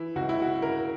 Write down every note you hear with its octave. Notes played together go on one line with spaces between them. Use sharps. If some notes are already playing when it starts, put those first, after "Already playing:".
Already playing: E3 E4
C#2 F#4
E4
F#4
C#3 A#4